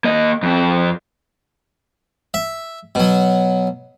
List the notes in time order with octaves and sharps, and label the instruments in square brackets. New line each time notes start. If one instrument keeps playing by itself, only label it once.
[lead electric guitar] A#3 D#5
F2 C4
[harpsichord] E5
B2 F#3